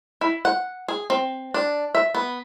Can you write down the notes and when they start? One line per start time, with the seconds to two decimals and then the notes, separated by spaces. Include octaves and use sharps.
0.21 E4
0.45 F#5
0.88 G#4
1.10 C4
1.54 D4
1.95 E5
2.15 B3